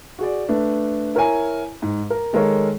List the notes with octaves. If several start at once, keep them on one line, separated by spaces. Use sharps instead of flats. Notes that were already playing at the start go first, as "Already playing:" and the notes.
F#4 G#4 D5
A3 D4 B4
E4 A#4 C#5 G#5
G#2
A#4
D#3 G#3 A4 A#4 C#5